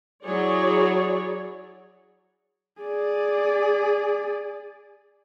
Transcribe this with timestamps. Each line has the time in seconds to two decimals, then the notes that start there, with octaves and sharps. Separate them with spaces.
0.24 F#3 E4 G#4 C#5 D5
2.81 G#4 D5